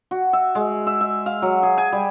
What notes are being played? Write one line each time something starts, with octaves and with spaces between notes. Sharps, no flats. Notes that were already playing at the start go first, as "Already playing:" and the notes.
F#4
E5
G#3
E5
E5
F5
F#3
G#4
G#5
G3